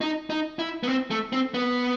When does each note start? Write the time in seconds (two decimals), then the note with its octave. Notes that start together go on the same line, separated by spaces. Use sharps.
0.01 D#4
0.30 D#4
0.59 E4
0.83 B3
0.88 C4
1.11 A3
1.33 C4
1.54 B3